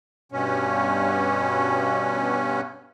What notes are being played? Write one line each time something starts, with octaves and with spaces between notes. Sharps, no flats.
G2 B2 C#4